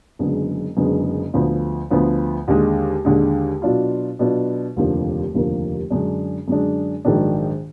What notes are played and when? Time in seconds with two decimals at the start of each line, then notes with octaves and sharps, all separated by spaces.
0.19 F#1 F#2 D3 G#3 B3
0.77 F#1 F#2 D3 G#3 B3
1.34 D2 D3 F3 B3
1.91 D2 D3 F3 B3
2.48 D#2 D3 G#3
3.05 D#2 D3 G#3
3.62 B2 F#3 D4 F4
4.19 B2 F#3 D4 F4
4.76 F1 D#2 D3 F3 A#3
5.33 F1 D#2 D3 F3 A#3
5.90 F#2 D3 G#3 D4
6.48 F#2 D3 G#3 D4
7.05 A#1 G#2 D#3 F#3 D4